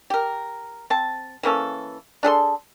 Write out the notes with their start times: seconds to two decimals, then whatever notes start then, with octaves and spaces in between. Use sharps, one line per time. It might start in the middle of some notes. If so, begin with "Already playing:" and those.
0.10 G4 A#4
0.90 C4 A5
1.43 E3 A#3 C#4 A4
2.23 D4 G#4 A4 C6